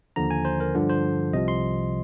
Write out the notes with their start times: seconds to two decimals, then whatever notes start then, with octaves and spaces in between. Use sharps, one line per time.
0.16 D#2 D3 F3 A#5
0.30 G#5
0.45 C5
0.60 A#4
0.75 G2 D3 F3
0.90 C5
1.33 C2 C3 F3 D#5
1.48 C6